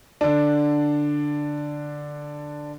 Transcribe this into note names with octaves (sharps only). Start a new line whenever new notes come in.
D3 D4